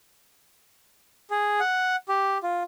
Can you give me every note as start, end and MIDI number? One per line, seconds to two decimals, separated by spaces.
1.30 1.60 68
1.60 1.96 78
2.09 2.38 67
2.43 2.63 65